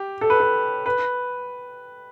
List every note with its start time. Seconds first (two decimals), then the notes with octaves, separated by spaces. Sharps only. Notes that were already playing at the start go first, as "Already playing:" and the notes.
Already playing: G4
0.21 A4
0.30 B4
0.40 A4
0.86 B4